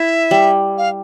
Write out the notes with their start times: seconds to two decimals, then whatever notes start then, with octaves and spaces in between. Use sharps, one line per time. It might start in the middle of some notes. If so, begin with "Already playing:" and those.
Already playing: E4 E5
0.31 G3
0.78 F5